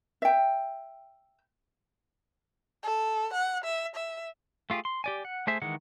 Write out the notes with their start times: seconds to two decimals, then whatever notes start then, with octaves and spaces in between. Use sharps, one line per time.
0.22 E5 G5
2.83 A4
3.33 F#5
3.64 E5
3.95 E5
4.70 A3 F4 G4 G#4
4.85 C6
5.04 G4 D5 G#5
5.25 F#5
5.47 A3 G#4 C5 E5 G#5
5.62 D#3 E3 G#3 G#4 F#5